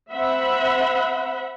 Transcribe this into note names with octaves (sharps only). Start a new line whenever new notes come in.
C4 E5 F#5 B5